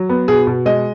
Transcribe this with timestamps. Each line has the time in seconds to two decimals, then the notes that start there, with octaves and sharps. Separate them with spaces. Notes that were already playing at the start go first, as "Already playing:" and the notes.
Already playing: F#3
0.09 B3
0.28 B2 G#4
0.47 B2
0.66 G#3 D#5